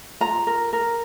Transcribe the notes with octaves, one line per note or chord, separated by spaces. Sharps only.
F4 A#5
A#4
A#4